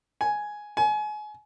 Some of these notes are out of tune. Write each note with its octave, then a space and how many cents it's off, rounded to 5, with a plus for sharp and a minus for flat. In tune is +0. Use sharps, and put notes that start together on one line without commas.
G#5 +5
G#5 +30